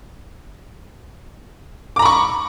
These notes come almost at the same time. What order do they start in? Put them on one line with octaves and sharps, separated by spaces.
D6 A#5 B5 C#6